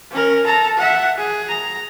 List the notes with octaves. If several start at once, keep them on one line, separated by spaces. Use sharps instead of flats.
C#4 A#4
A4 A#5
E5 F#5
G#4
A#5